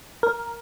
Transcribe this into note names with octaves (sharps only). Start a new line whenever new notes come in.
A#4